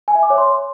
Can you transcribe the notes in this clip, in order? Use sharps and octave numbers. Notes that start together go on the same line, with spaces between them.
G#5
E5
D6
C#5
C6